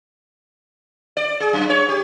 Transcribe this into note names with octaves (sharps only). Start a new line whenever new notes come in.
D5
G#4
F#2
C#5
G4